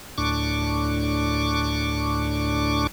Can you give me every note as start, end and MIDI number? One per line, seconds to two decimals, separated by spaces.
0.18 2.87 38
0.18 2.87 45
0.18 2.87 62
0.18 2.87 85
0.18 2.87 86